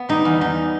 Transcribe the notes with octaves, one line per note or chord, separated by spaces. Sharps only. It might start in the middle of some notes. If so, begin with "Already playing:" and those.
Already playing: B3
G3 D#4
E2
E2 D#4